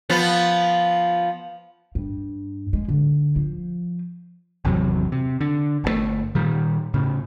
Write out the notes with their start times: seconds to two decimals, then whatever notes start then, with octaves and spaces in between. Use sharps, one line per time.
0.10 F3 B3
1.95 G2
2.73 G#3
2.88 D3
3.36 F3
4.65 G#1 E2 C3 F#3
5.12 C3
5.41 D3
5.84 G1 C3 A3
6.35 A#2 D#3 G3
6.94 A2 C#3